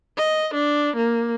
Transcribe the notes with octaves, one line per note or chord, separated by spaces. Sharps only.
D#5
D4
A#3